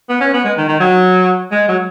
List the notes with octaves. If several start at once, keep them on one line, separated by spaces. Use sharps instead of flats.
B3
C#4
B3
G#3
D#3
D#3
F#3
G#3
F#3